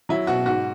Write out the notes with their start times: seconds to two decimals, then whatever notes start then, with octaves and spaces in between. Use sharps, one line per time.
0.09 F#3 E4
0.27 B2 F#4
0.46 G#2 F#4